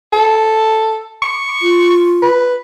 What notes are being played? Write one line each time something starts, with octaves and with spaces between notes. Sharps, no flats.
A4
C#6
F4
B4